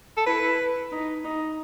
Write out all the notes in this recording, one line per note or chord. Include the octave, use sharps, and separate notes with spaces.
A4
E4 B4
D#4
D#4